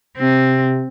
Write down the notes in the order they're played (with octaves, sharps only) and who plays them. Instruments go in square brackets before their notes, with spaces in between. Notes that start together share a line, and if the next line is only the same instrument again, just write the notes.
[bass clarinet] C3 [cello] C4